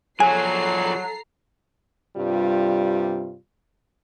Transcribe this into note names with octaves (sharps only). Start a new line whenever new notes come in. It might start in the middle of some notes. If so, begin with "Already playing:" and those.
F3 F#3 G#4 A4 G#5 A#5 C7
G2 C3 G3 F4